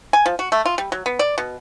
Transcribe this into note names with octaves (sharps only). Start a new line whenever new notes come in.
G#5
F3
F#4
A3
F4
G3
F#3
B3
D5
B2